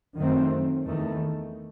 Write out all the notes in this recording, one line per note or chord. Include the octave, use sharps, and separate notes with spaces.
F#2 D#3 F#3 A3 C4
E2 D#3 A3